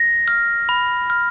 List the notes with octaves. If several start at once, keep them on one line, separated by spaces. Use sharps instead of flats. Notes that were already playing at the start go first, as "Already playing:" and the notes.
Already playing: A#6
F6
B5
F6